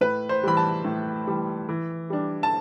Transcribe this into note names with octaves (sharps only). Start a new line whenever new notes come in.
A2 B4
C5
E3 G3 B5
A5
A2
E3 G3
E3
G3 D4
A5